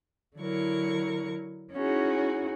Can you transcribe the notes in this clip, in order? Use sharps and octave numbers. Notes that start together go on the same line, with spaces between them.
D3 F#3 E4 A#4 C#6
C#4 D#4 E4 F#4 G#4